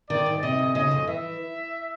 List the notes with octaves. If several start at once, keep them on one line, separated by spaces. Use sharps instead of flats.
D#3 D5
G#2
C3 D#5
D2
C#3 D#5
F2
E3 E5